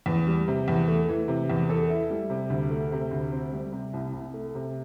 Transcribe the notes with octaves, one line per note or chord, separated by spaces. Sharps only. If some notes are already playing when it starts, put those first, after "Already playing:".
E2
G3
C3
E2
A3
E3
C3
E2
A4
E4
G3
C3
D2
A3
C3
D2
C4
G3
C3
C2
C2
A3
C3